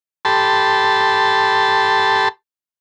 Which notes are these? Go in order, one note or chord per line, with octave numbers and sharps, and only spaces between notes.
G4 A4 A5 B5 C6